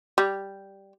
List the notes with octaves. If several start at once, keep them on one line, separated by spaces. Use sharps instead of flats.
G3